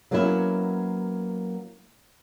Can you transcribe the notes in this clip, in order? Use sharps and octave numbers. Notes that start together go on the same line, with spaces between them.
F#3 A#3 B3 C#4 E4